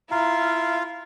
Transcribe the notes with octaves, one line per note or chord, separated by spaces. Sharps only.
E4 F4 F5 A#5